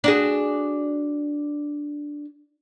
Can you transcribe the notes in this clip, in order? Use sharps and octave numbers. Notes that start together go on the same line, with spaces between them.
D4 F#4 G#4